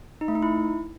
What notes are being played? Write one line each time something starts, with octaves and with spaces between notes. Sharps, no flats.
D#4
A3
D#4
E4